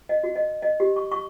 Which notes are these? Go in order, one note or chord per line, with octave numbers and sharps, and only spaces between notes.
D#5
F#4
D#5
D#5
G4
C#6
C#6